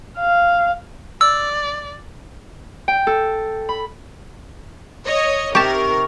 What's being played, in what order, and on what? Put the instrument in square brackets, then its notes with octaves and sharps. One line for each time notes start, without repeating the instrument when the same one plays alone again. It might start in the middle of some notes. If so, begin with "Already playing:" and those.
[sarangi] F5
[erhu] D5 [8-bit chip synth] E6
[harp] G5
A4
B5
[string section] C#5 D#5
[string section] C3 D#3 A#4 [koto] G4 A5 [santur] C#6